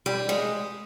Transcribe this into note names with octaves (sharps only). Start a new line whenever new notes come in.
G3
G#3